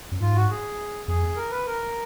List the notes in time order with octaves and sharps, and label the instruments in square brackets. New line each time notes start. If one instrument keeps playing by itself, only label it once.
[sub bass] F#2
[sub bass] G#2 [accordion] F4
[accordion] F#4
G#4
[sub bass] F2 [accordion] G#4
[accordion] A#4
B4
A#4